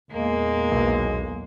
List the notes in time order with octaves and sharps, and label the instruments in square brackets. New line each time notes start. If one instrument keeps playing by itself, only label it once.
[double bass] E2 A#2 [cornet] G#3 [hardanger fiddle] A#3
[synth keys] B1